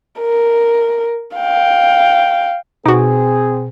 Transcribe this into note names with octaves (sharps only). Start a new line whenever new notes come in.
A#4
F5 G5
B2 C4 D#4 F#4 G#4